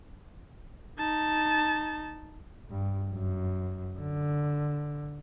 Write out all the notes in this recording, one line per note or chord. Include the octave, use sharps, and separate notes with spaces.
D#4 A5
G2
F#2
D3